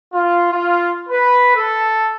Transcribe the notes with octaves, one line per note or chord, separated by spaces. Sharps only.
F4
F4
B4
A4